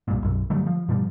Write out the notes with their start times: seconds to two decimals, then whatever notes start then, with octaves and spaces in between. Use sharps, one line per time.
0.08 C2 G2 A#2
0.23 B1 F#2
0.50 D3 F#3 G3 A3
0.66 F3
0.88 G2 B2 F3 G3